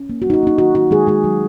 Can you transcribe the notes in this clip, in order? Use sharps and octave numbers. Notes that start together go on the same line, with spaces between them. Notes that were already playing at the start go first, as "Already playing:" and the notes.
Already playing: C#4
A#3
F#4
F#3 D#4
F#4
A#3 D#4
D#3 F#4
D#3 F#4
D#3 G#3 G#4
D#3 G#3 G#4
F#3